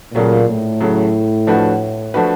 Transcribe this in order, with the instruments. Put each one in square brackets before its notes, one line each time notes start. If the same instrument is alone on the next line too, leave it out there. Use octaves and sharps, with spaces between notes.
[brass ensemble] A#2 [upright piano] C#3 F#3 A3
[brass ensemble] A2
[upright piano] C#3 F#3 A3
F3 A3 D4 F#4 B4
F3 A3 D4 F#4 B4